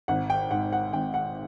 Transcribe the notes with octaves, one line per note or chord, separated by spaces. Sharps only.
G#1 F#5
G5
G#2 F#5
F#5
G#1 G5
F#5